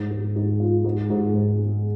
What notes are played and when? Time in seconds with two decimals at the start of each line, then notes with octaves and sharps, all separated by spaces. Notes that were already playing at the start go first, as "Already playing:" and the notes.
Already playing: G#2
0.11 G#2
0.36 G#2
0.60 F4
0.85 G#2
1.10 G#2
1.34 G#2
1.59 G#3